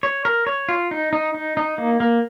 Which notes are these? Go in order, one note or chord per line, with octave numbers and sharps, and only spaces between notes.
C#5
A#4
C#5
F4
D#4
D#4
D#4
D#4
A#3
A#3